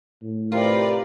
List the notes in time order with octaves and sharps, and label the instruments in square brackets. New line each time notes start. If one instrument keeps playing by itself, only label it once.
[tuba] A2
[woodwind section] C3 A#4 [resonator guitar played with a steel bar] F4 [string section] G4 B4 D5